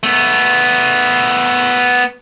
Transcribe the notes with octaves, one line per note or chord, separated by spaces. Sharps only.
A3 B3